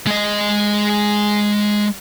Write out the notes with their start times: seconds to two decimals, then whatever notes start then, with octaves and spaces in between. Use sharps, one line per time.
0.07 G#3 D#5